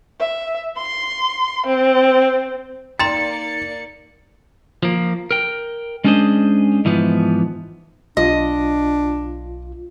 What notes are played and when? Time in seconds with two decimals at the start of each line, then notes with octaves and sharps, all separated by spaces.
0.20 E5
0.77 C6
1.67 C4
2.99 A#3 D#4 D5 G5 A#5 C6 A6 C#7
4.83 F3 A#3
5.31 A#4 G5
6.04 G#3 C#4 D4 G#4 C5 D#5
6.85 G#2 E3 F3 B3
8.17 B1 D4 F4 D#5